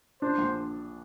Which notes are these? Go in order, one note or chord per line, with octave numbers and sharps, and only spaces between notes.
D4 C5
A#1